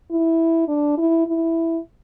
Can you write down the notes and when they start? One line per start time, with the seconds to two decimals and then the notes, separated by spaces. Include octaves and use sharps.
0.11 E4
0.68 D4
0.97 E4
1.27 E4